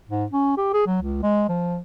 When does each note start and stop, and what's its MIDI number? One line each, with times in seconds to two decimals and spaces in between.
0.10 0.25 44
0.32 0.57 61
0.58 0.73 67
0.74 0.85 68
0.86 0.98 54
1.02 1.21 37
1.23 1.47 56
1.49 1.79 53